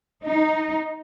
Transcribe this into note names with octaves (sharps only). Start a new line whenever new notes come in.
D#4